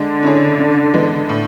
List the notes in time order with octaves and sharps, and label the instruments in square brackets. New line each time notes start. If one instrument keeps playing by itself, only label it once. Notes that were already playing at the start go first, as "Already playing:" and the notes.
Already playing: [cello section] D3 [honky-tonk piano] G#3
[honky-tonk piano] C#4 E4 G#4 C#5
C#3
E3 G#3 B3
A2